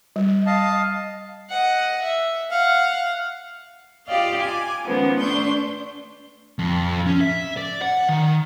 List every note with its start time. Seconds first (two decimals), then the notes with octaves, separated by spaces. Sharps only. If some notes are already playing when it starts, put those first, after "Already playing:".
0.16 G3
0.46 D#5 F5 A5
1.50 D#5 F#5
2.02 E5
2.51 F5 F#5
4.06 F4 G4 D5 D#5 F5
4.40 G#5 D6
4.86 D#3 F3 G#3 B3 C#4
5.18 A3 D4 C6 C#6 G6
6.59 F2
7.06 C#4
7.21 E5
7.57 D5
7.82 F#5
8.09 D#3